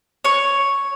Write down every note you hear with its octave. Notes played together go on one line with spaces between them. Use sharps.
C#5 C#6